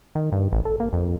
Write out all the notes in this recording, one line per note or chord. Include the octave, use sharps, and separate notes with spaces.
D#3
G2
A1
A4
A#3
F2